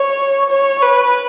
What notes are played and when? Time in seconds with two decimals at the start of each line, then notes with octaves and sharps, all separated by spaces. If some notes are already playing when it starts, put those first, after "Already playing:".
Already playing: C#5
0.50 C#5
0.82 B4